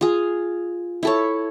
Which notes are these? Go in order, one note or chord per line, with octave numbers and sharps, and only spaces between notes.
F4 G#4
E4 A4 C#5